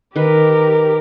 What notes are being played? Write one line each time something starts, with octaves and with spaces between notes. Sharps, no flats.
D#3 G4 A#4 B4